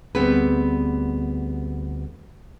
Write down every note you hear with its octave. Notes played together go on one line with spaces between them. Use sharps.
D2 G3 B3 C4 G#4 B4